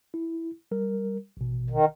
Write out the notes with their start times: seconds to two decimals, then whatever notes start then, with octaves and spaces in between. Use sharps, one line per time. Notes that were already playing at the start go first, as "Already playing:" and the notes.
0.14 E4
0.71 G3 A#4
1.37 A1 B2
1.70 D#3